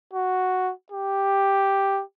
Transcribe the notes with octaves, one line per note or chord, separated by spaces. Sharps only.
F#4
G4